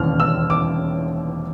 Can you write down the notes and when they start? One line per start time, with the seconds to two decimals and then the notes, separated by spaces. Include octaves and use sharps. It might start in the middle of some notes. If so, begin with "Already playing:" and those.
Already playing: E1 D#2 C#3 F6
0.20 E6
0.50 D6